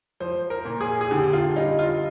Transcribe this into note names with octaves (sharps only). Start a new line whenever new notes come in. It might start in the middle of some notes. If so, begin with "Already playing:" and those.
F3 C5
A#4
A#2
G#4
G#4
D3 G4
G4
F4
G3 D#4
F4